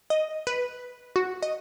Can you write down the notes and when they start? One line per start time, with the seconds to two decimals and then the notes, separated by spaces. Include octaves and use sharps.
0.10 D#5
0.47 B4
1.16 F#4
1.43 D#5